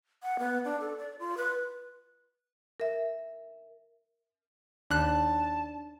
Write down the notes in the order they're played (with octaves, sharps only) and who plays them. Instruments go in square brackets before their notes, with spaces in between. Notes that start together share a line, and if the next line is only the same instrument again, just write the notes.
[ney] F#5
B3
D4
A4
D5
F4
B4
[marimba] A#4 E5
[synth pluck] D#2 F#6 [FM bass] D4 [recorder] A5